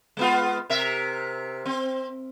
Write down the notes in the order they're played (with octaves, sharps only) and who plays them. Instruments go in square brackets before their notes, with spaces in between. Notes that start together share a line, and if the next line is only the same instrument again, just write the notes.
[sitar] G#3 B3 F4
C3 A#4 E5
C4